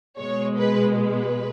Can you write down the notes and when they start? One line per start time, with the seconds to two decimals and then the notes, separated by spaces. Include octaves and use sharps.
0.19 B2 G#3 C#5
0.58 B4
0.98 B4